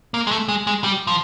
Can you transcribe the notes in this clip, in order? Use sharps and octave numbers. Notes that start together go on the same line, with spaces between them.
A#3
G#3
A3
G#3
G#3
G3
F3